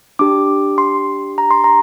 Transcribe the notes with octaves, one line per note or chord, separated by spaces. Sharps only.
D4 G4 D6
C6
A#5
C6
A#5